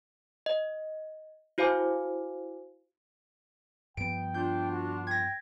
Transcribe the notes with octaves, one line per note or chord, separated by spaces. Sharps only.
D#5
E4 F#4 C5 F5 G#5 D6
G2 F3 B3 G5 D7
D4 F4 G6
F#4
G5 G#6 A#6